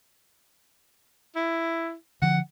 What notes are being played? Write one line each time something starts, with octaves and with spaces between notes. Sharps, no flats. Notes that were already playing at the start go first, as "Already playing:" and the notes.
E4
D3 F3 F#5